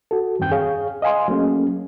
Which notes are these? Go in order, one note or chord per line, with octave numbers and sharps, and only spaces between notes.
F#4 A4
E2 G2 D#3 C4 G5 G6
G#4 C#5 F5
D#5 F5 G#5 C6
F#3 A3 A#3 C#4 G#4